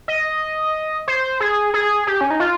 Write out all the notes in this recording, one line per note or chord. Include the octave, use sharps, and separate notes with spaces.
D#5
C5
G#4
G#4
G4
C#4
D#4
F4